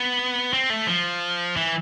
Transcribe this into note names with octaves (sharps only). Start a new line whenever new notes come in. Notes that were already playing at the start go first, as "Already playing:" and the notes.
Already playing: B3
C4
A3
F3
E3